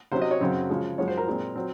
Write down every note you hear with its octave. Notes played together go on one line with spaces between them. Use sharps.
C3 F#3 C#4 C5
D#5
C#5
F#2 C#3 F#3 C4
C#3 F3 G#3
F#2 F3 G#3 C#5
C5
A#4
A#2 G#3 C4
F#3 C4